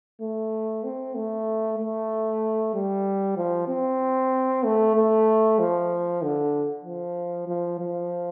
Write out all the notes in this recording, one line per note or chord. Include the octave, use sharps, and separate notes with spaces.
A3
C4
A3
A3
G3
F3
C4
A3
A3
F3
D3
F3
F3
F3